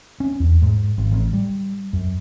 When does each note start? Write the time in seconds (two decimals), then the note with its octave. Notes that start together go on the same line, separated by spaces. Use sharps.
0.20 C#4
0.40 E2
0.62 G#2
0.98 G#1
1.11 A1
1.33 G3
1.93 F#2